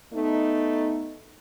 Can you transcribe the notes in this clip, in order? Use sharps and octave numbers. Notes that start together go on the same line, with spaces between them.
A3 B3 D#4